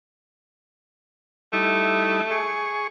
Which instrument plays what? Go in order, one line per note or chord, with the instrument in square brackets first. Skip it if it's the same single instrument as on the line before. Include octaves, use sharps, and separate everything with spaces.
[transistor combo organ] G3 D#4 E4 [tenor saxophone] A3
[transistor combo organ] G#4 C#6